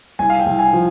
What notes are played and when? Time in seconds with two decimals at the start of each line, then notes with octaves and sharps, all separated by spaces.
0.19 C2 G#5
0.30 F5
0.39 G5
0.46 C2
0.59 G#5
0.73 F3